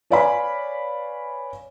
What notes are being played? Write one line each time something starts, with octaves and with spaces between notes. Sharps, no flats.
B4 C#5 D5 F5 G#5 B5